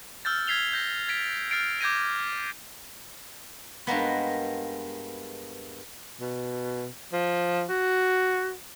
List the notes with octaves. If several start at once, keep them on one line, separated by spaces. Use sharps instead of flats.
E6 F6 G6 A6
F6 G#6 B6 C7 F7 G7
G6 A#6
G#6 A6 B6 D7 F7
F6 A6 C7 D7
D6 G6 G#6 A#6 D#7
G2 G#3 A#3 B3
B2
F3
F#4